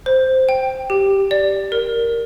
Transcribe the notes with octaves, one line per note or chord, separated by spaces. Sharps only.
C5
G5
G4
D5
A#4